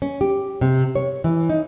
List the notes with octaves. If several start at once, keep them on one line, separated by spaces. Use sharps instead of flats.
C#4
G4
C3
C#5
E3
D#4